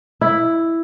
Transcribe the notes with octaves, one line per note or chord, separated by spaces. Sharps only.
E4